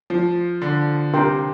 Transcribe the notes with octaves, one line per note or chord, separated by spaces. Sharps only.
F3
D3
C3 D4 G4 A#4 G5 C6